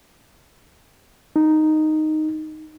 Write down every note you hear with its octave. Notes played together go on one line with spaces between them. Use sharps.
D#4